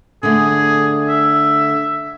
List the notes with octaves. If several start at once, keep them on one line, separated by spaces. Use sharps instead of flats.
D3 A3 G#4
E5